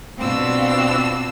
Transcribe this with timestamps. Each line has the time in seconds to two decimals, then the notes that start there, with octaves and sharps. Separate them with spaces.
0.19 B2 C4 D4 F4 E6